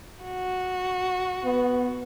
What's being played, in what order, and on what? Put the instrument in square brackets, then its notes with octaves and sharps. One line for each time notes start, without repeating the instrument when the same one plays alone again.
[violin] F#4
[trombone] B3